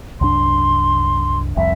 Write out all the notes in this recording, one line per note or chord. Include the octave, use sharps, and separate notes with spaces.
C2 F#2 D4 C6
F1 C2 F2 E5